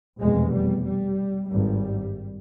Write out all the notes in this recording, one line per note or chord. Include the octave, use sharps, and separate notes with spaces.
F1 E2 B2 G#3
G3
G3
G#1 G2 G3